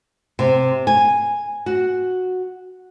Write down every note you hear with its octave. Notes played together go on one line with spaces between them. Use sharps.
C3
G#5
F#4